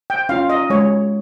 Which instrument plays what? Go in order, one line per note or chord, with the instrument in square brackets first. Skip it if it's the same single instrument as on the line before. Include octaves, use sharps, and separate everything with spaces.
[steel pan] G5
C#4 F4 F5
D#5
G#3 C#5